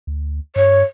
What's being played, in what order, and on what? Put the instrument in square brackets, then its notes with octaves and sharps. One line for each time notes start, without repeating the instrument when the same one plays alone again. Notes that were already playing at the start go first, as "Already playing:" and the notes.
[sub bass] D2
[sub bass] G2 [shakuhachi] C#5